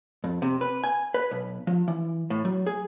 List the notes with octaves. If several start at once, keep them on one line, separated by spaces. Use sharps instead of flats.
F2
C3
B4
G#5
B4
B1
F3
E3
A2
F#3
G#4